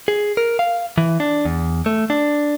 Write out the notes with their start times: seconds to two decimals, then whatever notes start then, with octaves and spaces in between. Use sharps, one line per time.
0.08 G#4
0.37 A#4
0.59 F5
0.98 E3
1.20 D4
1.45 E2
1.86 A3
2.10 D4